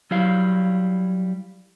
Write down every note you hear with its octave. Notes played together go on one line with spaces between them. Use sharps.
F#3 G3 E4 F5